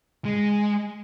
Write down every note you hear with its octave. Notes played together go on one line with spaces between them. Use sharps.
G#3